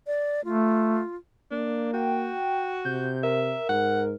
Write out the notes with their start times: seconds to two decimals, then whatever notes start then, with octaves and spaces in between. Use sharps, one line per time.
0.07 D5
0.45 A3 F4
1.51 A#3 D4
1.93 F#4 G5
2.85 C3 G6
3.23 A#4 E5
3.69 G#2 F#5